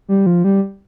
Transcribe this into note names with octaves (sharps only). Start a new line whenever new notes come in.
G3
F3
G3